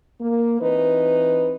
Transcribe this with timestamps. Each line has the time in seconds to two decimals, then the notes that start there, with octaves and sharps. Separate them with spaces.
0.20 A#3
0.61 E3 C4 D#4 B4